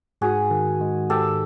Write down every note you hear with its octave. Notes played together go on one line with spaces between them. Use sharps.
G#2 F#4 G#4
D#3
G#3
G#2 G4 A4